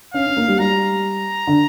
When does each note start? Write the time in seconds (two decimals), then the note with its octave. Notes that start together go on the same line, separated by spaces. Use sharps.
0.14 C#4 F5
0.26 C#4
0.37 A#3
0.48 G3
0.59 G3 A#5
1.47 D3